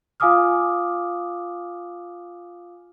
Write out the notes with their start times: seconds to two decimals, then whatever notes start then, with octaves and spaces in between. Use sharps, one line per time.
0.20 F4 F5 G#5 D6 D#6 F6